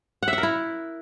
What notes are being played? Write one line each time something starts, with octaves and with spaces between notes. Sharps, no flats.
F#5
E5
F#5
A#4
E4